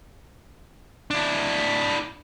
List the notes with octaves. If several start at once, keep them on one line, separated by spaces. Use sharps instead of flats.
D4 E4